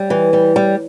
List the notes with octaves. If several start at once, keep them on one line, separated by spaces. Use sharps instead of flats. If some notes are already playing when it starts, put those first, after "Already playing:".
Already playing: G3
E3
G3
G3